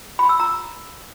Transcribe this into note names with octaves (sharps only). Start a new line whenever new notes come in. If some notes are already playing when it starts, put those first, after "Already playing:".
B5
E6
A#5